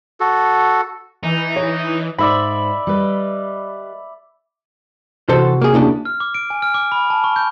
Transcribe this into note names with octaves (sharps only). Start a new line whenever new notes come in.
F#4 A4
E3 D#4
C#5
G#2 D#4 C5 D5 E5 B5
G3 B4 D#5
C3 E3 F#4 A4 C5
A#3 G#4
D2 C#3 A#3 D4 E4
F6
D6
D7
G#5
F6
D6
B5
A5
C#6
G6